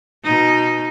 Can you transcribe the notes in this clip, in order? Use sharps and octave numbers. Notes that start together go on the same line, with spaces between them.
B2 D#4